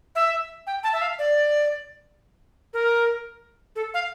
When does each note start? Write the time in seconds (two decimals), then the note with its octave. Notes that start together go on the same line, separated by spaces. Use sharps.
0.15 E5
0.67 G5
0.84 A5
0.93 E5
1.01 F5
1.19 D5
2.74 A#4
3.76 A4
3.94 F5